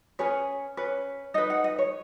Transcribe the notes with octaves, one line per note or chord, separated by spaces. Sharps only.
C#4 G#4 B4 C#5
C#4 B4
D#4 B4 D#5
F#5
D#5
C#5